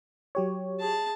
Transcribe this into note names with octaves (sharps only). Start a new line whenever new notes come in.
F#3 G4 C#5
G#4 A5